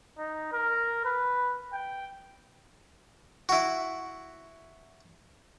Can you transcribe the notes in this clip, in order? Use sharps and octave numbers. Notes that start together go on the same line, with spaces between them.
D#4
A#4
B4
G5
E4 F#4